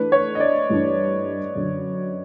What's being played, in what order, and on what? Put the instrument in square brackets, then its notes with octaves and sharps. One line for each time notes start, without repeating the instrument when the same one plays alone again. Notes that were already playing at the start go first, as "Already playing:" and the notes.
Already playing: [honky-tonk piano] E3 A3 D4 [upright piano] B4
[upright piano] C#5
D#5
D5
[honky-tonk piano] G2 E3 A3 D4
F#2 D3 F#3